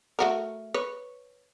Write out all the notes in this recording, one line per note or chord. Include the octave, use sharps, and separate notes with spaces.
A3 F#4 A#4
B4 C#5